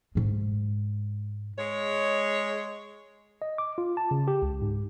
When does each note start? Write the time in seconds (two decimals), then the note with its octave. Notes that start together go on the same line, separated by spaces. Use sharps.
0.15 G#2 G#3
1.59 G#3 C#5
3.42 D#5
3.58 D6
3.78 F4
3.97 A5
4.11 C#3
4.28 G4
4.42 C#2
4.62 G#2